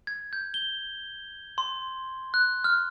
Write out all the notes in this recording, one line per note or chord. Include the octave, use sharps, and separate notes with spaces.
G#6
G6
G7
C6
F#6
F6